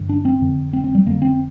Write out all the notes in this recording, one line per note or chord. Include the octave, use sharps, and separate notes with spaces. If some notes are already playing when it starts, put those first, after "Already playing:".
Already playing: G2 D3
D4
C4
F2 D3
C4
C4
G3
F2 D3 A#3
C4